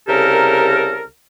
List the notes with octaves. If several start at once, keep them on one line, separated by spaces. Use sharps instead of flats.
C2 C#3 G4 A4 A#4